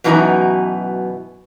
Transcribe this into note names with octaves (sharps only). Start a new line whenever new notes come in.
F#2 B2 E3 D#4 F#4 A#5